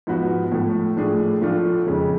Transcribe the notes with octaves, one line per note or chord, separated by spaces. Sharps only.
G#2 F3 G#3 B3 F#4
A2 F3 A3
A2 F3 A3 D4 G#4
A2 F3 A3 D4 F4
F2 C#3 G#3